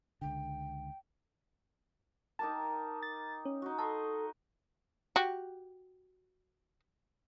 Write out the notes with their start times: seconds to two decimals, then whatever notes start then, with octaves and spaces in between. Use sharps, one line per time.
0.22 C#2 D3 G5
2.39 D#4 G4 A#4 A5
3.03 A6
3.45 C#4
3.62 D#4 F#4
3.79 A4 D#5 C6 C#6
5.16 F#4 G4